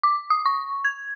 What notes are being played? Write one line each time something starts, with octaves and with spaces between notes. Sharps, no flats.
D6
D#6
C#6
G#6